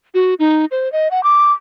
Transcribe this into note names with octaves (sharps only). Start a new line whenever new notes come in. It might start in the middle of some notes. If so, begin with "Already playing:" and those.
F#4
D#4
C5
D#5
F#5
D6